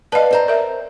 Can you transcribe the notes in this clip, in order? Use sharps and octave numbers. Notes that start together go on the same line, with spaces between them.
B4 D5 D#5 F5 A5
C4 C5 A#5
A#4 E5